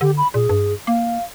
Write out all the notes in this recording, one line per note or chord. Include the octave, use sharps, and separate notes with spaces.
D3 G4
B5
A#2 G#4
G2
A#3 F5